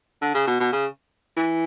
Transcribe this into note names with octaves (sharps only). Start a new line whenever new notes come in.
D3
C#3
B2
B2
C#3
E3